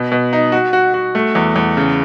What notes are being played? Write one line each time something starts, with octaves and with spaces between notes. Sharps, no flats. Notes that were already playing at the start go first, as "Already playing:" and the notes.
Already playing: B2
B2
D#4
F#4
F#4
F#4
A3
E2
E2
C#3